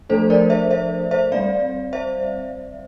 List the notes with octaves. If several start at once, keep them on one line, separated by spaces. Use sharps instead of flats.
F3 A3 D4 A4 C5
A#4 D5
C5 E5
C5 E5
C5 E5
G3 C4 D5 F5
C5 E5